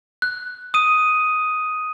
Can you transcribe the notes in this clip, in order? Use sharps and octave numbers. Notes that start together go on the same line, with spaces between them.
F#6
D#6 D#7